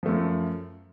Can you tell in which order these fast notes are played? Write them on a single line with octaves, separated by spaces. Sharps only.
F3 A3 F#2